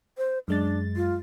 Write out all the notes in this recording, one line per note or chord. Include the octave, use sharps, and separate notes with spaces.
C5
F#2 G#3 D4 A6
F4